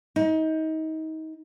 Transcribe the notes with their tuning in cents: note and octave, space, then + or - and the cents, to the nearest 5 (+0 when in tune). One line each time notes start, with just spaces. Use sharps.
D#4 +30